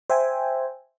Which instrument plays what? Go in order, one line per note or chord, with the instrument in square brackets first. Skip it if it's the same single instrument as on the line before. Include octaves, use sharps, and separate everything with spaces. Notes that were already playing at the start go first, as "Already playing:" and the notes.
[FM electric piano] C5 E5 G5 G#5